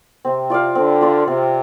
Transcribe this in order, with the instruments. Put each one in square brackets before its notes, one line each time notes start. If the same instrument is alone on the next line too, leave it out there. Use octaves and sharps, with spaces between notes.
[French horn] C3 [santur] C4
[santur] F4 D5 F5
[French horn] D3 [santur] C4
[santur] F4 D5 F5
[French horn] C3 [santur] C4